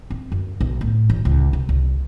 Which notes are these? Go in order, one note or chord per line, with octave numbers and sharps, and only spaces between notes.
C4
F#2
B1
A2
A1
C#2
C3
C2